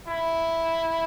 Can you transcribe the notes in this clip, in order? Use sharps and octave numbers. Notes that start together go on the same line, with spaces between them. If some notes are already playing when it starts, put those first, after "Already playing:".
E4